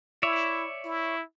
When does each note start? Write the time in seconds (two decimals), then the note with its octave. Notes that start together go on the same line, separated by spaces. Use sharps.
0.23 E4 C#5 D5 E5
0.85 E4